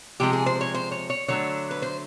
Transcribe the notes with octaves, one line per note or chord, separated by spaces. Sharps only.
C3 F3 G#3 G4
G#4
C5
C#5
C5
C#5
C#5
D3 F#3 A3 C#5
B4
C5